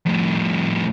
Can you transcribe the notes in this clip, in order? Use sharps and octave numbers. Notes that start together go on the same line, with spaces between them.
F2 A2